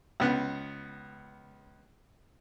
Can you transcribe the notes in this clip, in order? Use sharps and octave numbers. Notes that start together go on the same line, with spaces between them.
C#2 B3 F#6